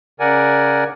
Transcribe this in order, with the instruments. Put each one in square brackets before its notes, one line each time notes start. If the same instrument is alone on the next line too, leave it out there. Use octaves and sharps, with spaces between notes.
[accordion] C#3 A#4 D5 F#5 G#5